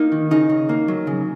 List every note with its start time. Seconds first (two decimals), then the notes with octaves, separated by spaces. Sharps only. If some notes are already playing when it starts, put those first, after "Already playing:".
Already playing: A#3 D#4
0.12 D#3
0.31 C#3 D#4
0.50 C#3
0.69 A#3
0.88 F#3
1.07 C#3